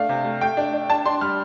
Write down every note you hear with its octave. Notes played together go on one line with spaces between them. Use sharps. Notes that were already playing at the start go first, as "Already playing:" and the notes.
Already playing: A3 D4 F5
C3
A3
A3 G5
D4
D4
D4 A5
D4 C6
G3 F6